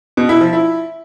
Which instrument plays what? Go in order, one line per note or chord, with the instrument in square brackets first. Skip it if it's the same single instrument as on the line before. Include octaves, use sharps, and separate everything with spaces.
[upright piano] B2
E4
F3
E4